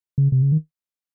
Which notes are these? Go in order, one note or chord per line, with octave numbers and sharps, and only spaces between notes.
C#3
C3
C#3
D#3